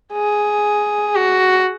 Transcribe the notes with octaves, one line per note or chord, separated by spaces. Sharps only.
G#4
F#4